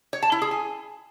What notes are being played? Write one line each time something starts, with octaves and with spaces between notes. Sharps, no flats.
C#5
A5
E4
G#4
G#5